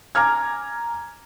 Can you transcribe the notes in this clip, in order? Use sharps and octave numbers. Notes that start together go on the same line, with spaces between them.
G#5 A#5 D6 F6 G#6